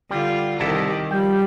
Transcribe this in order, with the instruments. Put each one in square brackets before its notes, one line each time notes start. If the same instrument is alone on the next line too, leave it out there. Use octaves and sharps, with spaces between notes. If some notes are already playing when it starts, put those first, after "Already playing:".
[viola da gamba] D3 F4 [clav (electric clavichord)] G3
[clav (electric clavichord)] C2 E4 A4 [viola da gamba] D#3 G4
[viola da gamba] F3 [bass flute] G3 [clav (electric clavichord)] G5